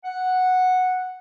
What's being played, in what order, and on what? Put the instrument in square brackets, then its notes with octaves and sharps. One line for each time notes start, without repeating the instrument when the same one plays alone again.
[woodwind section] F#5